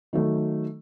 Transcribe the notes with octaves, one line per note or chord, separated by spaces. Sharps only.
D#3 F#3 A3